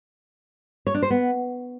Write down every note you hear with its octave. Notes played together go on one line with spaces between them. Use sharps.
C#5
D4
C5
B3